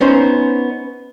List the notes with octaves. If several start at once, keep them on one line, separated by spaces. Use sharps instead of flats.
B3 C#4 D#4 C5